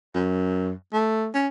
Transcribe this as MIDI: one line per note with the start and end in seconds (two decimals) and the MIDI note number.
0.15 0.71 42
0.93 1.29 57
1.34 1.48 61